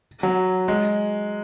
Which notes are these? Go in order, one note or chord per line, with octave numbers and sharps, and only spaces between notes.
F#3
G#3